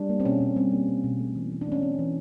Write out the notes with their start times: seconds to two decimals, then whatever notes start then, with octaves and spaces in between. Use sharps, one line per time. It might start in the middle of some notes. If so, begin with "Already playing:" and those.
Already playing: G3 D4
0.09 A#3
0.20 C4
0.25 B2 C#4
0.41 B2
0.56 G3 C4
0.72 A#3
0.89 B2
1.04 B2
1.19 A3
1.36 E3
1.52 E3
1.61 D4
1.67 A3 C#4
1.82 A3 C4
1.99 E3